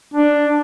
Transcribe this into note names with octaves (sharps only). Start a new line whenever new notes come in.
D4